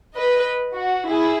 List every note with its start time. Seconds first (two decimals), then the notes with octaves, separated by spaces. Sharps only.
0.16 B4 D#5
0.76 F#4
1.07 E4 G#4